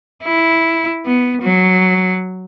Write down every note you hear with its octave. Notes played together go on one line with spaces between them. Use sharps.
E4
B3
F#3